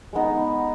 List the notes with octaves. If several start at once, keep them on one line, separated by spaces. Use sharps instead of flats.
G#3 B3 D#4